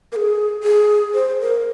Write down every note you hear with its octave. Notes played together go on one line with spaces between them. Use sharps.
A#4
G#4
G#4
C5
A#4